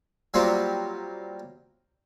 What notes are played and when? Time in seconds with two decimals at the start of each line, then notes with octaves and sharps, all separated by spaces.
0.34 F#3 G3 A#3 C4 F4 G4